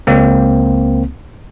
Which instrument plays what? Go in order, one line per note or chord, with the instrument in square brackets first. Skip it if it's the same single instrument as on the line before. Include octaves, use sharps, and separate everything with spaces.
[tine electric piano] C#2 A#3 C4